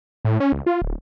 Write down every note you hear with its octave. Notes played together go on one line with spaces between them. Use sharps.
A2
C#4
C#2
F4
D1